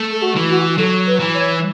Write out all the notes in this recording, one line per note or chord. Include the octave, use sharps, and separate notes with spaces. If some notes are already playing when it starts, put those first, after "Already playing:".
Already playing: A3
A4
F#4
E3
F#4
F#3 A4
B4
E3
C#5